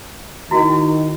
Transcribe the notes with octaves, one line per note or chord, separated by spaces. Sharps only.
D#3 E4 F#4